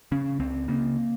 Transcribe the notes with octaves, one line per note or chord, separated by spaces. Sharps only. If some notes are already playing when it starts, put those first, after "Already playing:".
C#3 C#4
C#2 C4
C#3 A#3